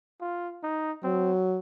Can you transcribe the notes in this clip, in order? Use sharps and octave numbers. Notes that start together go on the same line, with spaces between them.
F4
D#4
F#3 C4